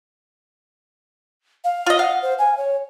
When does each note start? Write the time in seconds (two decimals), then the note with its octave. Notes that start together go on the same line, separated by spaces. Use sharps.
1.64 F5
1.86 F4 D#5
1.99 F5 F#5
2.22 C5
2.39 G#5
2.58 C#5